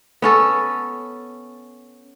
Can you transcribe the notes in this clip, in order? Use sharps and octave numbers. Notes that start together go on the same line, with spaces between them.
B3 C#4 A4